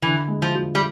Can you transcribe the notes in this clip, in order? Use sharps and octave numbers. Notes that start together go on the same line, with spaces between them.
D3 E3
G#3
F3
F3
G3